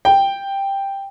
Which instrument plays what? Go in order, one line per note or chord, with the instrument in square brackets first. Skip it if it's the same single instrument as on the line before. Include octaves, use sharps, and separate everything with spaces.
[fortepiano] G5